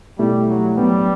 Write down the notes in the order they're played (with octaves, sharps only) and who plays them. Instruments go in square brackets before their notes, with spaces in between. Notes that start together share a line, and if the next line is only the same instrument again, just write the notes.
[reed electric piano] B2 A3 E4 G4 [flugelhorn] G3
[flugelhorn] F#3
[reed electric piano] A2 F#3 B3 D4 [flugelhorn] G3